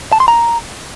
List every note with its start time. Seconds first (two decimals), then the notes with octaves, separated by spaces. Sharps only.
0.12 A5
0.20 C6
0.28 A#5